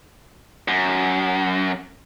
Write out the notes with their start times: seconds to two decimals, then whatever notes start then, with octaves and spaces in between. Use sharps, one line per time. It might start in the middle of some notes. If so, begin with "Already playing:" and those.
0.68 F#2